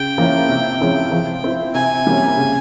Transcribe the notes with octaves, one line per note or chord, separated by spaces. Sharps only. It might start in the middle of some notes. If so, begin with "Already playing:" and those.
Already playing: C#3 G5
F3 A#3 C#4 E4
C3
F3 G#3 C#4 E4
F3
C4 E4
C3 G#5
G3 A#3 C#4
C#3